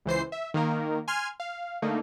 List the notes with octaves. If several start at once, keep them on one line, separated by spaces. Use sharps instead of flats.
C#2 E3 C5 C7
E5
D#3 A#3 A#4
G#5 C6 F6 G#6
F5
D3 A3 A#3 D#4